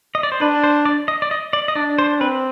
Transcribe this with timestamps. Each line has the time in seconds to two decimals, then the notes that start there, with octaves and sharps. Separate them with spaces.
0.15 D#5
0.23 D5
0.32 C5
0.41 D4 B4
0.64 C5
0.85 D5
1.08 D#5
1.22 D5
1.31 D#5
1.53 D5
1.68 D#5
1.76 D4 D5
1.99 C5
2.20 C4 B4